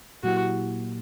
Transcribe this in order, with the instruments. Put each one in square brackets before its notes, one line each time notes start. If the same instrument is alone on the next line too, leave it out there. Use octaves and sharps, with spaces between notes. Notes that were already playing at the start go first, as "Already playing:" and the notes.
[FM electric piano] A#2 F#3 A#3 E4 G4 [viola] F#4